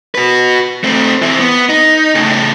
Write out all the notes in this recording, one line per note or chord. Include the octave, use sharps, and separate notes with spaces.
F#4 B4
A3 C4
E3 C4
B3
D#4
A2 C#3